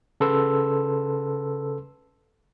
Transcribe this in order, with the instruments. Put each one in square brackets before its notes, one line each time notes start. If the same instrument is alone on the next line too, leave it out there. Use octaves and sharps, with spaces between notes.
[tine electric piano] C#3 A4 B4 C6 E6